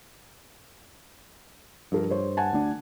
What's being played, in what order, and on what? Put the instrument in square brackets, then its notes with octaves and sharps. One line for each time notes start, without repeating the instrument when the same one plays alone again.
[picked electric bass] G2 [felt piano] F3 A4 A#4
[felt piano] C5 C#5
F#5 G#5 A5
[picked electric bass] D2 D4